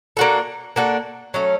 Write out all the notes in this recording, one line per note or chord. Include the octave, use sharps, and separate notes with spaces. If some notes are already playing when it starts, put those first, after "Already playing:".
A#3 D4 F#4 A4
A#3 D4 F#4 A4
F#3 A3 C#4